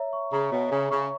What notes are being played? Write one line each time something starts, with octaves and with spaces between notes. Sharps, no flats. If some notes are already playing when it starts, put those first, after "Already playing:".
Already playing: C#5 E5 A#5
C#6
C#3 A#5
B2 C#5
C#3 E5
C#3 C#6